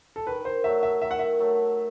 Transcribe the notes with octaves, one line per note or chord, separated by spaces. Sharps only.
A4
D#3 B4
C5
F#3 A3 E5
E5
D#3 E5
F#5
E5
F#3 A3